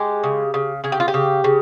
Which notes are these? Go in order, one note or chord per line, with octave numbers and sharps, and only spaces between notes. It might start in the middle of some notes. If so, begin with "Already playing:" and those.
Already playing: G#3 G4
C#3
C#3
C#3 G#4
G4
F4
G4
C#3
C#3